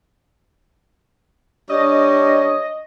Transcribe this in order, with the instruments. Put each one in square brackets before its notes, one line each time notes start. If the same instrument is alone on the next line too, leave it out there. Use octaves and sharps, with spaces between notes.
[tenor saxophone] G3 [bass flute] D4 [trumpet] C#5 [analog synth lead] D#5